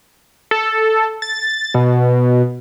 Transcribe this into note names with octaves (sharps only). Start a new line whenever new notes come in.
A4
A6
B2